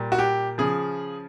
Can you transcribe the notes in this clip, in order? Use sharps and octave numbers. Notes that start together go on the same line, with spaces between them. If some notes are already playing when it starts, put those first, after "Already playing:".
Already playing: A#2 G3
F#4
G4
C#3 F3 G#4